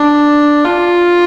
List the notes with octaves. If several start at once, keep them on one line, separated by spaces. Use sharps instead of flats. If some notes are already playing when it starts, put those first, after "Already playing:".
Already playing: D4
F4